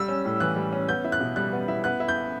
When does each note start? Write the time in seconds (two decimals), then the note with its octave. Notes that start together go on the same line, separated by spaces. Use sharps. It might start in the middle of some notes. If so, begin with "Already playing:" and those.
Already playing: G3 E6
0.08 C#4
0.25 A2
0.40 E3 F#6
0.56 G3
0.73 C#4
0.89 B3 G6
1.04 E4
1.12 F#6
1.20 B2
1.36 G3 F#6
1.52 B3
1.68 E4
1.84 B3 F#6
2.00 E4
2.08 G6